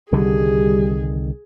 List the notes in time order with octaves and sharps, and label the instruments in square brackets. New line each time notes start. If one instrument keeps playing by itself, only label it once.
[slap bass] C2 D3 D#3 [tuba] G3 [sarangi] G#4